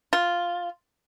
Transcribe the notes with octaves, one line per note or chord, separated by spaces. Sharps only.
F4